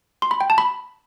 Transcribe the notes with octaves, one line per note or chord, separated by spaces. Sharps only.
C6
B5
G5
A5
B5